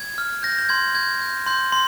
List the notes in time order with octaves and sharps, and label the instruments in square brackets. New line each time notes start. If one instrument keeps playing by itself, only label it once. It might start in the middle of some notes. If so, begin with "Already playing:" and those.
Already playing: [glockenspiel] G#6
F6
G6 A#6
G6
C6 G#6
G6 G#6
G6
C6 G6
C6